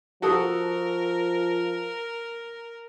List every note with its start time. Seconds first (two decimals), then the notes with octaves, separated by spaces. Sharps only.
0.22 F3 F#4 A4 A#4 D#6